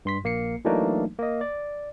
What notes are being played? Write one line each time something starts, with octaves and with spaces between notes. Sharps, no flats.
G2 C6 B6
A#1 A#3 C7 C#7
E3 F#3 A3 A#3 D4 D#4
A#3 D#5
D5